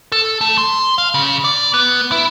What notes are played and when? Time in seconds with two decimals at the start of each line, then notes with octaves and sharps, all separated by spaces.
0.12 A4
0.41 A3
0.58 C6
0.98 F5
1.14 C#3
1.44 D5
1.74 B3
2.12 E4